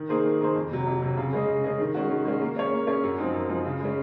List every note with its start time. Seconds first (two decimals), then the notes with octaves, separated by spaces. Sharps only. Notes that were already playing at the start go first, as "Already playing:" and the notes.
Already playing: D#3
0.09 A#3 D#4 G#4 C5
0.25 D#3
0.41 A#3 D#4 G#4 C5
0.56 F2
0.71 C3 F#3
0.87 F2
1.02 C3 F#3
1.17 C#3
1.33 G#3 C#4 G#4 D#5
1.48 C#3
1.64 G#3 C#4 G#4 D#5
1.80 D#3
1.95 G#3 C#4 F#4
2.10 D#3
2.25 G#3 C#4 F#4
2.41 A#3
2.57 C#4 G#4 C#5
2.72 A#3
2.87 C#4 G#4 C#5
3.04 F#2
3.19 F3 C4 D#4
3.34 F#2
3.49 F3 C4 D#4
3.65 C#3
3.80 G#3 C#4